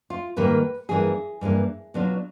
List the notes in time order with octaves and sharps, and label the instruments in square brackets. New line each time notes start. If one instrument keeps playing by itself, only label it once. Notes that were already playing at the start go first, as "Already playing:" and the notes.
[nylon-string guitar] F4
G#2 D#3 G3 A#3 B4
G2 E3 G3 A#3 D4 G#4
G2 E3 G3 A#3 D4
B2 F#3 B3 D4 F4